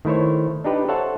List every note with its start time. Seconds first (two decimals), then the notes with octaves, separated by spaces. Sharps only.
0.05 D#3 A3 E4 C5 C#5
0.64 D4 D#4 G4 B4
0.88 A4 C5 C#5 E5 F#5 A5